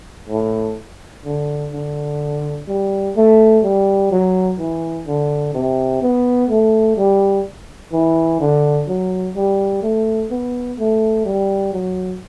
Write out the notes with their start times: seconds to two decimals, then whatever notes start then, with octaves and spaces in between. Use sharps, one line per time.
0.29 A2
1.25 D3
1.73 D3
2.68 G3
3.16 A3
3.64 G3
4.11 F#3
4.59 E3
5.07 D3
5.54 C3
6.02 B3
6.49 A3
6.97 G3
7.93 E3
8.40 D3
8.88 F#3
9.36 G3
9.83 A3
10.31 B3
10.79 A3
11.26 G3
11.73 F#3